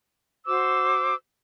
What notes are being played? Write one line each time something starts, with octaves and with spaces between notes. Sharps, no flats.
F#4 C5 D6 E6